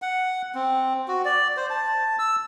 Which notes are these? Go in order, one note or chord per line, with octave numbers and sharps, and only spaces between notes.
F#5
C4
F#4
D5
C5
A5
E6